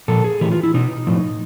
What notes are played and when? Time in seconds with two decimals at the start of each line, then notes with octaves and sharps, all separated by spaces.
0.08 A#2 F3 A4
0.24 G#4
0.41 A2 E3 G4
0.52 F4
0.63 E4
0.74 B2 D#4
1.07 A2 F3